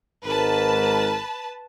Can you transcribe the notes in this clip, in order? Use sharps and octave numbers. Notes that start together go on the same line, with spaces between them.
G#1 G#2 A#4 B4 A5